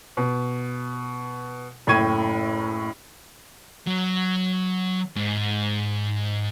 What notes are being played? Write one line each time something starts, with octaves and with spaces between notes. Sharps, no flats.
B2
F#1 A2 G5 C#6 G#6 D#7
F#3
G#2